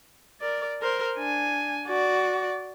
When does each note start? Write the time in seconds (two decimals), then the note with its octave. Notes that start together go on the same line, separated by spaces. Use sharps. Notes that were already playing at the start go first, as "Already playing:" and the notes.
0.40 A#4 D5
0.82 A#4 C5
1.17 D4 G#5
1.87 F#4 D5